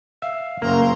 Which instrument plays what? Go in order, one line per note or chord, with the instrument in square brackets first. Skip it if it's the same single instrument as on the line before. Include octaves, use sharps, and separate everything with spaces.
[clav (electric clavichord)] E5 [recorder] F5
[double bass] F#1 [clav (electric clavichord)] A#3 [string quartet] A#4 A#5 C6